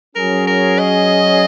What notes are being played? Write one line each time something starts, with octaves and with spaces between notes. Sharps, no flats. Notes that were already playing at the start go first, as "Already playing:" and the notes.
F#3 C#4 G#4 A#4
A#4
D#5